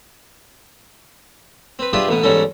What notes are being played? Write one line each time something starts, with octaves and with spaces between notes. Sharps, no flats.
C4 B4
D4 F4 G4 G#4 B4 E5
A1 B2 B3
E2 G#2 G3 C#4 F#4 A4